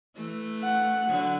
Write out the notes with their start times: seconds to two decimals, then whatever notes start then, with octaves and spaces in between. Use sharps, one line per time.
0.16 E3 A3
0.63 F#5
1.09 D3 F#3